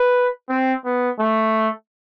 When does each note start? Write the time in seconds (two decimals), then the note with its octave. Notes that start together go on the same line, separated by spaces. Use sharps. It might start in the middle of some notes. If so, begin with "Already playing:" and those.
Already playing: B4
0.49 C4
0.85 B3
1.19 A3